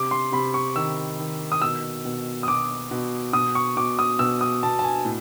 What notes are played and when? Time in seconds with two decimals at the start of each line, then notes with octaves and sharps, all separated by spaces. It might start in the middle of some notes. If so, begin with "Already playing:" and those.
Already playing: C3 D6
0.11 C6
0.32 C3 B5
0.54 C#6
0.76 D#3 E6
1.19 D#3
1.52 D#6
1.62 B2 E6
2.05 B2
2.43 D#6
2.47 B2 D6
2.91 B2
3.33 B2 D#6
3.55 C#6
3.77 B2 D6
3.99 D#6
4.19 B2 E6
4.41 D#6
4.63 B2 A5
4.79 A5
4.84 G#5
5.05 A2